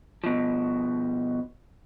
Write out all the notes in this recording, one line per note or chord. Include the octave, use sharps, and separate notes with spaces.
B2 F3